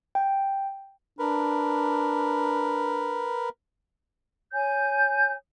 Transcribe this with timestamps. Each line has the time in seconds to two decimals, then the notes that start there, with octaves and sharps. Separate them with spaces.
0.15 G5
1.19 D4 A#4 B4
4.53 C#5 G#5 G6